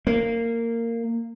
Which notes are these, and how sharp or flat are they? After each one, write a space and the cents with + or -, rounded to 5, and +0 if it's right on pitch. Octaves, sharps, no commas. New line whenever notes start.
A#3 -15